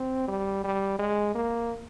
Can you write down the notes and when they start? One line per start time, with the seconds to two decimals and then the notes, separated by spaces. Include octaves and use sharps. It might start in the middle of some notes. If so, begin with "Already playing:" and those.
Already playing: C4
0.28 G3
0.64 G3
0.99 G#3
1.35 A#3